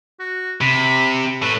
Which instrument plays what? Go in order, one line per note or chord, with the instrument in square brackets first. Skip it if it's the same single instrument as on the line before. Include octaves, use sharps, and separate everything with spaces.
[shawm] F#4
[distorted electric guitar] C3 [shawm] B5
[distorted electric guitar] A2 [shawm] B4